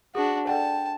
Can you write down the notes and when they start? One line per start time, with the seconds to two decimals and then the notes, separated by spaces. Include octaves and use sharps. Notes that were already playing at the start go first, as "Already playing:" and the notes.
0.15 D4 F#4 G#4
0.47 A4 D5 F#5 G5 A5